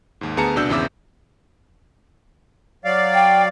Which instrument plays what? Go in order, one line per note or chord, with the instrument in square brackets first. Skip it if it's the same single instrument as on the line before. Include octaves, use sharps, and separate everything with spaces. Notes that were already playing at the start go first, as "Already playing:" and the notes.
[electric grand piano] D#2 G#2
D2 B3 G#4 A5 A#5 C#7
C2 B2 D4 E6 G6
G#1 E2 C#3 E5 D6 E6
[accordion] F#3 D5 F5
[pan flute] G5